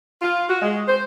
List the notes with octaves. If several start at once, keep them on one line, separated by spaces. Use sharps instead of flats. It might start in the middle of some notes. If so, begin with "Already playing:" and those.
F4
F#4
G#3
C5